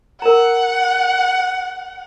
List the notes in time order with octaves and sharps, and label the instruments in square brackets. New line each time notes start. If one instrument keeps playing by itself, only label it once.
[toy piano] A#4 A#5 [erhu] F#5